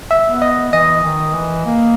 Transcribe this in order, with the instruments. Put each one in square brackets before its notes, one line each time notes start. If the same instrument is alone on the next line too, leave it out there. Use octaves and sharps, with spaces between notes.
[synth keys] E5
[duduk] B3
[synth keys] D#5
[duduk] E3 [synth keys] D#5
[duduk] D#3
E3
A#3